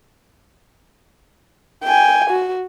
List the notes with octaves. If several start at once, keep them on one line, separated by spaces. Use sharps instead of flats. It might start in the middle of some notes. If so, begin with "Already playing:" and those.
G5 G#5
F#4